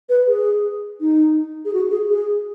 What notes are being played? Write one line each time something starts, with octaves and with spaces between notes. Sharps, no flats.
B4
G#4
D#4
G#4
F#4
G#4
G#4